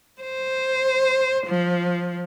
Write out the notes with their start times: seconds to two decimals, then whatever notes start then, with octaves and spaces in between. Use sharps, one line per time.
0.21 C5
1.47 F3